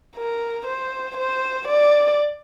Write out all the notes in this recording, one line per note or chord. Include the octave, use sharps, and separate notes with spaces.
A#4
C5
C5
D5